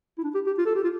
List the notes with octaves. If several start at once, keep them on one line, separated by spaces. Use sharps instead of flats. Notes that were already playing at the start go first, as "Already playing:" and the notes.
E4
D4
G4
G4
F4
A4
G4
F4